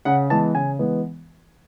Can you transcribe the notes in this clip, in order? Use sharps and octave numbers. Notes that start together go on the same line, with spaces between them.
C#3 F#5
E3 G#3 B3 A5
C#3 G#5
E3 G#3 B3